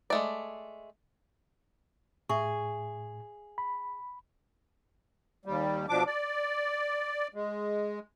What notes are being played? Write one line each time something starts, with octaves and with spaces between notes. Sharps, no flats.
G#3 A3 D5
A2 G#4 E5 C#6
B5
D#2 G3
B2 F3 D4 D6
D5
G#3